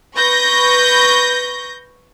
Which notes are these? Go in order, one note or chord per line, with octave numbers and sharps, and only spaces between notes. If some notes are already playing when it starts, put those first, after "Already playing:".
B4 C#6 G6 A#6